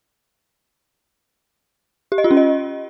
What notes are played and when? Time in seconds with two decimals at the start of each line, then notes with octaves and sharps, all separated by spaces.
2.12 G4
2.18 D#5
2.24 F4
2.31 C#4
2.37 D#5